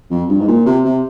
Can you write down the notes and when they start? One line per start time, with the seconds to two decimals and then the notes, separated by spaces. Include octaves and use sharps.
0.10 F2
0.29 G2
0.40 G#2
0.48 A#2
0.66 C3
0.84 C3